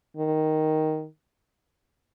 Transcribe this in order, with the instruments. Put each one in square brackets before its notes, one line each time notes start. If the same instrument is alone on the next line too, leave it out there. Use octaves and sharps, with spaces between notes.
[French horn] D#3